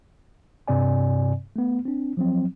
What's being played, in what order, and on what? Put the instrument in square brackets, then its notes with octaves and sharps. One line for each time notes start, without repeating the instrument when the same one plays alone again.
[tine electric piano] G2 C3 C4 D5 G#5
A3 B3
C4 D4
F3 F#3 C4